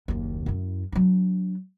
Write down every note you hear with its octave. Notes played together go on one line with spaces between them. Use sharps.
F#1 D#2
F#2 E4
F#3 D4